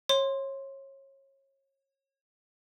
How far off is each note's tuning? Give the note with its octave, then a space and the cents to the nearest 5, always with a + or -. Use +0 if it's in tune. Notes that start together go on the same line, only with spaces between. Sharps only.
C#5 -30 C6 +0